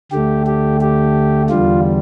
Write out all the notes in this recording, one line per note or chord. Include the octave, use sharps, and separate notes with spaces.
D2 D3 A3 G4
G4
G4
E2 D3 G3 F4